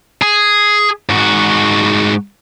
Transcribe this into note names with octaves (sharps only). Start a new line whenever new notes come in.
G#4
G#2 F#4